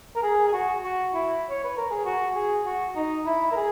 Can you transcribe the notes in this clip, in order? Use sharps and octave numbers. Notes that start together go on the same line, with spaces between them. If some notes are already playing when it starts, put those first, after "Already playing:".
A#4
G#4
G#4
F#4
F#4
E4
C#5
B4
A#4
G#4
F#4
G#4
F#4
D#4
E4
A#4
G#4